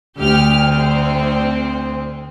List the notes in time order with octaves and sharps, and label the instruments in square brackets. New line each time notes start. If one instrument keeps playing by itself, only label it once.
[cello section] D2 [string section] G4 F6
[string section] C4